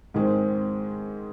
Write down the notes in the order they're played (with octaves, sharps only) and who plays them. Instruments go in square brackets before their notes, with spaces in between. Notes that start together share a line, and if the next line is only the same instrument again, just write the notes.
[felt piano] G#2 D#3 G#3 C4